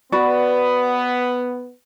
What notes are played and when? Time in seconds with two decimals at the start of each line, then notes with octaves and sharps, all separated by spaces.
0.12 B3 F#4 D5 B5